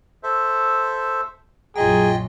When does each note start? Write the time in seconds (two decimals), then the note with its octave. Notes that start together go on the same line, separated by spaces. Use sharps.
0.23 A4 C5 E5
1.76 A#1 F#2 F4 G#4 D#5 G5 A#5